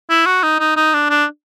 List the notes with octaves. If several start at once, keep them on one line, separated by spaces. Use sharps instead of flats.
E4
F#4
D#4
D#4
D#4
D4
D4